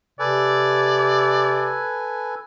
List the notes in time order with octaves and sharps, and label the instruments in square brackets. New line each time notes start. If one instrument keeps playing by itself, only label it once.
[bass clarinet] C3 [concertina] A4 B4 G#5 [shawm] D5